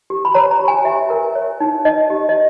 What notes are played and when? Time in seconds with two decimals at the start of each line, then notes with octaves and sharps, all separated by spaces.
0.10 G4
0.25 B5
0.34 C#5 A#5
0.51 A#5
0.60 G4
0.68 G#5
0.85 G4 E5
1.10 A#4
1.35 C#5
1.60 D#4
1.85 D#4 D#5
2.10 G4
2.29 D#5